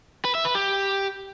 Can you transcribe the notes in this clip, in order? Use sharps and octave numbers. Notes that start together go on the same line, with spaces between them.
B4
E5
B4
G4